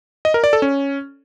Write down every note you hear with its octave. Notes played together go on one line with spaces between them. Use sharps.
D#5
A#4
D5
A4
C#4